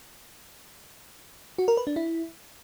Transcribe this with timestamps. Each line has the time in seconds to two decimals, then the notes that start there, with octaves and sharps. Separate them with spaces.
1.58 F#4
1.68 A#4
1.77 B4
1.87 D4
1.96 E4